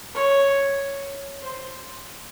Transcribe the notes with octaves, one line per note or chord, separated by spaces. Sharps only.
C#5
C5